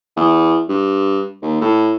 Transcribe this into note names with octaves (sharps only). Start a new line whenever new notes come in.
E2
G2
D#2
A2